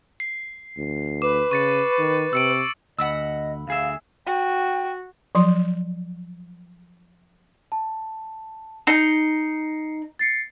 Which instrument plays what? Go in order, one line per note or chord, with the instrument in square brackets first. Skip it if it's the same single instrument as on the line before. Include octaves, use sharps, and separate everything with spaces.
[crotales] C7
[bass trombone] D2
[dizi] B4 [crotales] D6
[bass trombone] C#3 [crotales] C#6 A6 C#7
[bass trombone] D#3
[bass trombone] C3 [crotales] E6 C#7 D7
[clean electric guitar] D2 [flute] D#5 [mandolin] F#5 B5 E6
[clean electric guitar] D2 G#4 E5 [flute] F5
[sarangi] F#4 [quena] G5
[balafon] F3 F#3 C6
[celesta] A5
[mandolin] D#4 [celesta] C7 C#7
[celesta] A6 C7 C#7